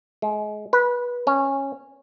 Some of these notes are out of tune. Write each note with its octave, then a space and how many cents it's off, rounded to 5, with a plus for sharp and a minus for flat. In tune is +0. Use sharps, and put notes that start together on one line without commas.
G#3 +30
B4 -20
C#4 -15